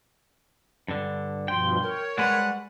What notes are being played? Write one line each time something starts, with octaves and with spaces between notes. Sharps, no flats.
G2 D3
G2 B2 F3 G5 C6
A#4 C#5
G3 G#3 B4 F#5